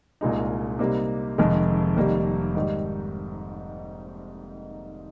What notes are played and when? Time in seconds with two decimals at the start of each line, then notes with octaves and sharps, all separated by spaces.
0.21 C2 A#2 G#3 D#4
0.79 C3 G3 A#3 D#4
1.38 F1 F2 D#3 G#3
1.96 F1 F2 D#3 G3 A#3
2.55 G#2 D#3 G3